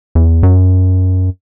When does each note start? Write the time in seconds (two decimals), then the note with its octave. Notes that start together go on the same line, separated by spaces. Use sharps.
0.15 E2
0.43 F#2